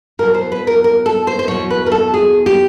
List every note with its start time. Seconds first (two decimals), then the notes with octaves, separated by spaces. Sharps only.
0.19 E2 B2 F#3 A#4
0.34 C5
0.52 B4
0.67 A#4
0.84 A#4
1.06 A4
1.27 C5
1.39 C5
1.48 E2 B2 F#3 C#5
1.71 B4
1.86 A#4
1.92 A4
2.14 G#4
2.46 G4